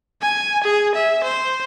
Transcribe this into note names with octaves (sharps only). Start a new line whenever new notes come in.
G#5
G#4
E5
C5